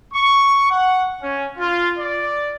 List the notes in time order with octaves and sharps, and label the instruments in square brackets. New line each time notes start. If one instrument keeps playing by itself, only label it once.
[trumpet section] C#6
F#5
C#4
F4
D5